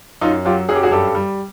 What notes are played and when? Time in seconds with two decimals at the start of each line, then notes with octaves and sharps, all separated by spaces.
0.21 F#2 D#4 F4
0.45 F#3 F4 G4
0.69 F#2 G#4
0.75 G4
0.83 F#4 G#4
0.91 G2 G4 A4
1.15 G3